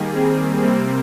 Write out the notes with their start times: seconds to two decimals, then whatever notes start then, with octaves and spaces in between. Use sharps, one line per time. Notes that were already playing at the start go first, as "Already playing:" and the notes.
Already playing: D#3 G3 A#3 G#4
0.14 C4
0.62 C3 G3 A#3 C4